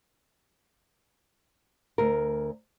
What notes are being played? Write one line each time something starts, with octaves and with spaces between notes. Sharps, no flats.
D2 A#4